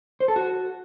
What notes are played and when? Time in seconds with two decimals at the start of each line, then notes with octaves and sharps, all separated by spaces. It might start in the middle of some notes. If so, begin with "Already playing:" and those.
0.20 C5
0.28 A4
0.36 F#4